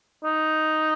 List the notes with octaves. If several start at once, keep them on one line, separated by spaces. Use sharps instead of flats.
D#4